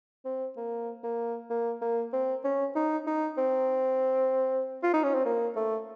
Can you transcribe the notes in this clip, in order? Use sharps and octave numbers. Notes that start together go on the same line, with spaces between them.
C4
A#3
A#3
A#3
A#3
C4
C#4
D#4
D#4
C4
F4
D#4
C#4
C4
A#3
A3